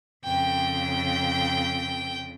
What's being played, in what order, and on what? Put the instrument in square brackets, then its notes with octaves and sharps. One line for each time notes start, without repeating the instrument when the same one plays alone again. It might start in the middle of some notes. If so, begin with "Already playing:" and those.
[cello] F2 C#3 [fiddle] G5